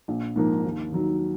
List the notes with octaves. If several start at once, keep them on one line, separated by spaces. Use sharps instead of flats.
A#1
G#2 F3 A#3
D#2
D#3 F#3